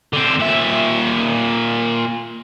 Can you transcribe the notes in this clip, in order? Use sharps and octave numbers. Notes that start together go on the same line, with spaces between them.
D3 C4
A#2 E5